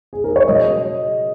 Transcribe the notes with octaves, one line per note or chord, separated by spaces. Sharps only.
G#4
A#4
C#5
C#3 F#3 D#5